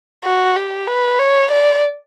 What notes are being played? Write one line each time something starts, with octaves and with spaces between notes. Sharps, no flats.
F#4
G4
B4
C#5
D5